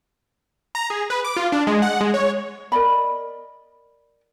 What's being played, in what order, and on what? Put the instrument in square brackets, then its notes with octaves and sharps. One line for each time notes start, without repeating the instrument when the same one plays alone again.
[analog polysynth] A#5
G#4
B4
D6
F4
D4
G#3
F#5
G#3
C#5
[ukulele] A#4 D5 D#5 B5